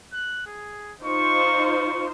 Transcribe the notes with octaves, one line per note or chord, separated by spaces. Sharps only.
F#6
G#4
D#4 F4 C5 C#6
C#6